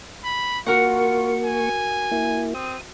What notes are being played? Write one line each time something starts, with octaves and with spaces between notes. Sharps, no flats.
B5
A#3 F4 F#4 A#4 F#5 C#6
G#5
A#3 E4
C4 D#6